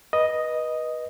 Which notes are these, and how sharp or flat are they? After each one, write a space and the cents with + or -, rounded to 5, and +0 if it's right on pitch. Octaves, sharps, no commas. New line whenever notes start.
B4 -20 D#5 +0